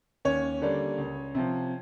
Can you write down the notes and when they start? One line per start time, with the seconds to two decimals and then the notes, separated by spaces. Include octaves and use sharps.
0.25 D#2 C#4 C#5
0.62 D3 G3 A#3 D4
0.98 C#2
1.35 C3 F3